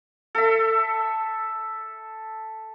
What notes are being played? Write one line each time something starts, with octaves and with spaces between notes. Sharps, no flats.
A4 E5